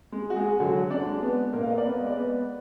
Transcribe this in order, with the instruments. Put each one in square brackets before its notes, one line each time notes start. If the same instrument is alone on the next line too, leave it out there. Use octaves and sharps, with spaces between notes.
[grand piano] G#3
F#4
G#3 G#4
D3 F#3 F#4
D4 D5
G#3
B3 B4
A#2 A#3 A#4
F5
D#5
D5
B3 B4
G#3 D#5
D5
B3 B4